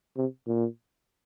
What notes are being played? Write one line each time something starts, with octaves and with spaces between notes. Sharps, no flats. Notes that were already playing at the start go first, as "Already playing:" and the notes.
C3
A#2